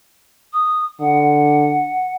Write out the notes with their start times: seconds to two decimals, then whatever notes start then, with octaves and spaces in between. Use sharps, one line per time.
0.53 D#6
1.01 D3 F#5